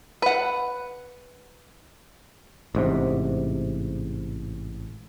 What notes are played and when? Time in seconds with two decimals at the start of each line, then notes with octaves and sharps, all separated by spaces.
0.22 B4 F#5
2.75 A1 G#2 C3